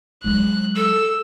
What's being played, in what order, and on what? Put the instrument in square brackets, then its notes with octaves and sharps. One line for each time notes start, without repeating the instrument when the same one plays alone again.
[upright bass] F#3 G#3 [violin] F#6
[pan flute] A4 [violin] E6